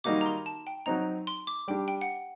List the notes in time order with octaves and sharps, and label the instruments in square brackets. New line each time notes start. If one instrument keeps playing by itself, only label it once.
[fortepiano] D#3 G3 A#3 D#4 F#4 [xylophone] D6
[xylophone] A#5
C6
A5
G5
[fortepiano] F#3 C4 D#4 [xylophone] A#5
[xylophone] C6
D6
[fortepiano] G3 D4 G4 [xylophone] G5
[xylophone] G5
F#5